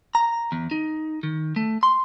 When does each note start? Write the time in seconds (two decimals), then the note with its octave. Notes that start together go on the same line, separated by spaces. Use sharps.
0.15 A#5
0.52 E2
0.71 D#4
1.23 D#3
1.56 A3
1.83 C6